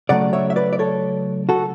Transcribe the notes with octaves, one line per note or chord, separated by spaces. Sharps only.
C#3 F#3 A3 D5 F#5
C#5 E5
E5
B4 D5
D5
A4 C#5
F#4 A4